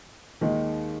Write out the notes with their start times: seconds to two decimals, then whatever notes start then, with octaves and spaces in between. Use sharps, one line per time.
0.41 D#2 D#3 G#3